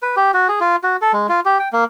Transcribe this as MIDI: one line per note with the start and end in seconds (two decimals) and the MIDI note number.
0.02 0.15 71
0.16 0.31 67
0.34 0.48 66
0.48 0.59 68
0.61 0.76 65
0.83 0.97 66
1.02 1.12 69
1.13 1.27 56
1.29 1.40 65
1.45 1.58 67
1.59 1.69 79
1.73 1.84 58